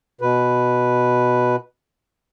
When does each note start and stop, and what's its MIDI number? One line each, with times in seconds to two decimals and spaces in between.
0.21 1.56 47
0.21 1.56 71